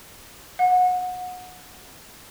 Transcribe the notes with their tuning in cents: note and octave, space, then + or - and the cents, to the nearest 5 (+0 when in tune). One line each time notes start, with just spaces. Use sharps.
F#5 -25